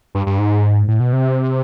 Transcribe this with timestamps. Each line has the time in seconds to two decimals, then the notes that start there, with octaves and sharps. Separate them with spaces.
0.15 G2
0.27 G2
0.39 G#2
0.88 A2
1.00 B2
1.13 C3